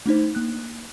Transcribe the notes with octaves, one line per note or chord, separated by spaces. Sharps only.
A3 D4 D#4 C5
A#3 F#6